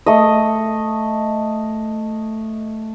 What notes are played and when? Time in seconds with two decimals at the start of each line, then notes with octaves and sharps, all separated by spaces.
0.06 A3 D#5